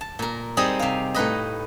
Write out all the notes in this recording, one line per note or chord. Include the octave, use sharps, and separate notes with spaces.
A5
A#2 A#4
G3 C4 D#4 G#4 D5 D#5
C3 F5
A2 D#4 B4 D#5